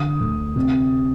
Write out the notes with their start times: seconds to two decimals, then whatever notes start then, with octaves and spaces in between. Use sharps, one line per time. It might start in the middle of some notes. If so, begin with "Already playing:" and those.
Already playing: D3 D#6
0.21 D2
0.56 C3